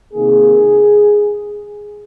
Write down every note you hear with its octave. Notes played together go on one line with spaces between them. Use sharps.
C3 D#3 A#3 G#4